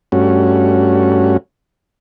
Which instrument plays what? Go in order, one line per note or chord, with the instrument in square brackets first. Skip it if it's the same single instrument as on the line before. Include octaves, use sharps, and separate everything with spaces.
[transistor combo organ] G2 A3 C#4 F#4